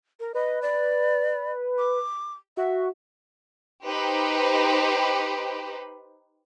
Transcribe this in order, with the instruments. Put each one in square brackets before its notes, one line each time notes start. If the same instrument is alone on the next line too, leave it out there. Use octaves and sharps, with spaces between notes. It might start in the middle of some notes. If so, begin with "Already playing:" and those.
[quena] A#4
[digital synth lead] B4 [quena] D#5
[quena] D5
D6
[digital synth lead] F#4 [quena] E5
[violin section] D#4 G4 B4 C5